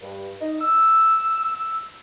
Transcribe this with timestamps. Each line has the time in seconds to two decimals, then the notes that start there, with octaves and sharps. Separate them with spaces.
0.01 G2
0.40 D#4
0.61 E6